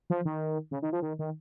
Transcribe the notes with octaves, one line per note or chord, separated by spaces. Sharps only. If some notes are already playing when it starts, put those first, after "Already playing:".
F3
D#3
C#3
D#3
F3
D#3
D#3